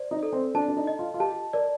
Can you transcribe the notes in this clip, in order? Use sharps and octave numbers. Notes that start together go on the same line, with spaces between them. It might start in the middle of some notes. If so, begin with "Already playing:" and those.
Already playing: C5 D5
D#4
A4
C4
D4 A5
D4
D#4
D#5
F4
F4
G4 A5
A#4 D5